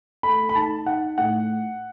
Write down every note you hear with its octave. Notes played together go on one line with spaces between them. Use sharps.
A3 B5
B5
D#4 A5
D#4 F#5
A2 F#5